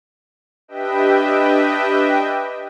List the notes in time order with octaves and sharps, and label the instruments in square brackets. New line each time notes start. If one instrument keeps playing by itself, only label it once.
[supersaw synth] D4 G4 B4 D#5 E5 G5